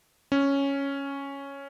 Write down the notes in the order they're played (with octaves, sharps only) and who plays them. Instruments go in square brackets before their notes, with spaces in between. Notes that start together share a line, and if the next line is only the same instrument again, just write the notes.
[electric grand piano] C#4